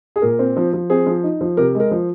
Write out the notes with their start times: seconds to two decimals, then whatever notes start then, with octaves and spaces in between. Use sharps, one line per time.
0.16 G#4
0.22 A#2 A#4
0.39 C4
0.57 F3
0.73 F3
0.90 C4 G#4
1.06 F3
1.24 D#4
1.41 F3
1.57 C3 A#4
1.75 G#3
1.80 A#4
1.91 F3